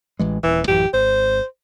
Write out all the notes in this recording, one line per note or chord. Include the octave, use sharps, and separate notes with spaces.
A1 E3 G#3
D#1 E3
A1 F#2 E3 G4
G#1 C5